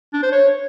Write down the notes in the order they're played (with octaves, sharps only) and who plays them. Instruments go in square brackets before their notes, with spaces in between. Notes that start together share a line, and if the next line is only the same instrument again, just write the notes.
[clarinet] D4
C5
C#5